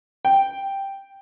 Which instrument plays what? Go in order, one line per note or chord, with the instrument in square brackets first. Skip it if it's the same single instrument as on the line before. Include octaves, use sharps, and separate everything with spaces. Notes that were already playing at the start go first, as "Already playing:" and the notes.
[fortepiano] G5